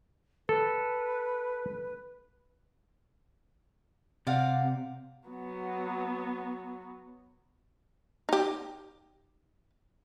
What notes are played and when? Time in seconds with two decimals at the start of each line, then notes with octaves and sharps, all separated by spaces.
0.49 A4 B4
4.27 C3 D5 F5 F#5
5.28 F#3 B3
8.29 D#4 G4